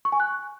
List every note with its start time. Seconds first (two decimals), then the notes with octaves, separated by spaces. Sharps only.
0.05 C#6
0.12 G#5
0.20 F#6